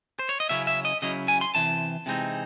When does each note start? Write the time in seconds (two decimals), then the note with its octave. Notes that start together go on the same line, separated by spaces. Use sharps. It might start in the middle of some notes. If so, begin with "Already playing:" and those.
0.19 C5
0.29 C#5
0.40 D#5
0.49 C#3 F#3 C#4 E4 E5
0.67 E5
0.85 D#5
1.02 C#3 F#3 C#4 E4 D#5
1.28 G#5
1.41 C6
1.55 C3 E3 A5
2.06 C3 E3 G#3 C4 D#4